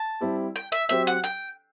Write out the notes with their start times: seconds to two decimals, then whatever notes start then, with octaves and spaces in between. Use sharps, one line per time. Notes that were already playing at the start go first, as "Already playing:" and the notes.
Already playing: A5
0.21 G3 C4 E4 G4
0.56 G5
0.72 E5
0.89 F#3 C4 G4 C5 E5
1.07 F#5
1.24 G5